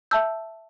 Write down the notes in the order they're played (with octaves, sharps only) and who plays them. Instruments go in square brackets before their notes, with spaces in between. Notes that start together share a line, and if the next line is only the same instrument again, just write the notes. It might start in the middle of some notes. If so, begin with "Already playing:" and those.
[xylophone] E5 A5 E6 G6